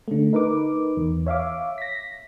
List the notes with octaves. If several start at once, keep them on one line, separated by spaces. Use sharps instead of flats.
D3 A3
D#4 A#4 B4 D6
E2
C#5 E5 F5 D6
A#6 B6